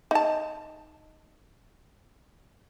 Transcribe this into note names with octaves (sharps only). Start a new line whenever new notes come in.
D#4 A5